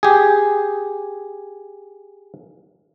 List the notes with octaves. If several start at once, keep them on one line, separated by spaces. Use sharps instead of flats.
G4 G#4